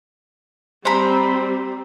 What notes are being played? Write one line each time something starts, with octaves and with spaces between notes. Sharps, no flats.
G3 C4 C5 A#5 B5